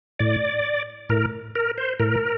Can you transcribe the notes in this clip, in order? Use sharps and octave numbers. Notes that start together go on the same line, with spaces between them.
A2 D5
A2 A#4
A#4
C5
A2 A#4